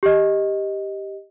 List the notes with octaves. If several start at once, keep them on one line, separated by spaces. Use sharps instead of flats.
G4 D#5